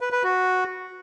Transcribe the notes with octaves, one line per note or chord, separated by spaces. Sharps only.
B4
B4
F#4